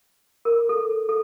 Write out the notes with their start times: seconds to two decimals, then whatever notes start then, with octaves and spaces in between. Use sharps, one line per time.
0.45 A#4
0.69 A4
1.09 A4